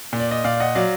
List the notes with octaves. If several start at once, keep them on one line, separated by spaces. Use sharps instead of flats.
A#2
D5
D#5
A#2 D5 F5
D#5 F#5
F#3 D5 F5